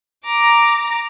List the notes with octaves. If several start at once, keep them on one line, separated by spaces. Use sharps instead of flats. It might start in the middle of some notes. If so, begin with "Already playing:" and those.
A#5 D6